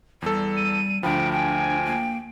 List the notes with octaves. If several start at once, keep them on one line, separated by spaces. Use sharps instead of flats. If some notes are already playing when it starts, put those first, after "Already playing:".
E2 G3 A4
D#7
D2 F3 D4 G5 B5
G5 G#5
A#3